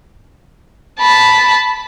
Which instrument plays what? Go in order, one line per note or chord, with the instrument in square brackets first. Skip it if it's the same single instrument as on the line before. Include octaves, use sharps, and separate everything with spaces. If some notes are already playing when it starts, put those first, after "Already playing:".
[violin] A5 B5